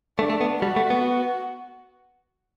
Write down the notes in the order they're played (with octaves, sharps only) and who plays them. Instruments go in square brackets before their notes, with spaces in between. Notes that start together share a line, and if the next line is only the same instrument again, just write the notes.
[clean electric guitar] A3 [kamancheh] D4
[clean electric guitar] A3
B3
[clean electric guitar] G3 [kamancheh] F#4
[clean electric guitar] A3
B3